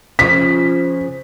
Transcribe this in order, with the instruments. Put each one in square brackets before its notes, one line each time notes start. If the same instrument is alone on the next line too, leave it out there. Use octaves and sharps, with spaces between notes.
[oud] C#3 F3 [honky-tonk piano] B6